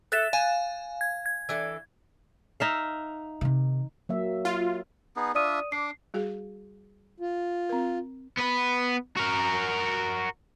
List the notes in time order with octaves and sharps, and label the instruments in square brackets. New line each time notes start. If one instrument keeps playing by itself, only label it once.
[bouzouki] A4 E5 [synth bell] F#6 A6 E7
[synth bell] F5 [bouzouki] G#5
[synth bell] G#6
G#6
[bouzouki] E3 D4 A4
[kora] D#4 E5 F5
[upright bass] C3 D#3
[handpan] F#3 A#3 E5
[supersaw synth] F4
[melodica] B3 D#4 G#4
[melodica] D4 F4 E5 [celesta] D5 D#6 D#7
[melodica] D4 D6 [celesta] C7
[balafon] G3 F#4 G#4
[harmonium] F4
[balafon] C4 A#4
[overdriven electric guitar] B3 B4
F#4 A#4